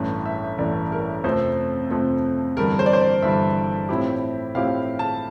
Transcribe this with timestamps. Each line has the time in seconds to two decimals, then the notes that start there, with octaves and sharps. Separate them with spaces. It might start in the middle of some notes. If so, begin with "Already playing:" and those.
Already playing: A1 G2 E3
0.26 E5
0.58 A1 G2 E3 D5
0.92 A#4
1.24 F2 C3 F3 A3 C4 C5
1.90 F2 C3 F3 A3 C4
2.57 G1 G2 E3 G3 A#4
2.79 C5
2.86 D5
2.93 C5
3.01 D5
3.23 G1 G2 E3 G3 E5
3.89 A2 F3 C4 E4 G4
4.55 A2 F3 C4 E4 G4 F5
4.99 A5